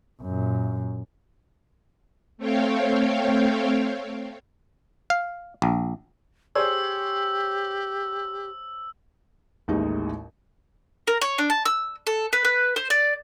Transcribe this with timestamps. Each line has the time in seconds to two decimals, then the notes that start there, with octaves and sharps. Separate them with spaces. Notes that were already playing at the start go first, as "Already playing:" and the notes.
0.22 F#2 A#2
2.38 A3 C4 C#5 F5 G5
5.10 F5
5.62 A#1
6.55 G4 G#4 C5 C#5 E6
9.68 A1 D#2 A2 G#3 D#4
11.07 A#4
11.21 C#5
11.38 D4
11.50 A5
11.65 E6
12.07 A4
12.33 B4
12.45 B4
12.76 C5
12.90 D5